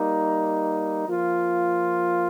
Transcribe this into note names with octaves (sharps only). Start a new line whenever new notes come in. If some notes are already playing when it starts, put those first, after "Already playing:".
Already playing: G3 A#3 D#4
F3 A#3 F4